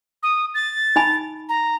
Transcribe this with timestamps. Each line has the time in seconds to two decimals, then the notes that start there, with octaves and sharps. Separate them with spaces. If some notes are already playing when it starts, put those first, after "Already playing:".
0.23 D#6
0.55 A6
0.96 D#4 G#5 B5
1.49 A#5